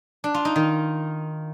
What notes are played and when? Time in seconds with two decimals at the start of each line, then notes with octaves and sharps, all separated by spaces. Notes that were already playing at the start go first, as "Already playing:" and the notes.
0.24 D4
0.34 F4
0.45 D#4
0.56 D#3